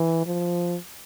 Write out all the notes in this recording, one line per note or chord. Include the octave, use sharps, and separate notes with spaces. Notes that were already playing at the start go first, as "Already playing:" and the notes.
Already playing: E3
F3